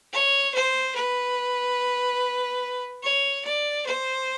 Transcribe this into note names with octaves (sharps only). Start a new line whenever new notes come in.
C#5
C5
B4
C#5
D5
C5